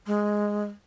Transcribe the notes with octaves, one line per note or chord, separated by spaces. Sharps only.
G#3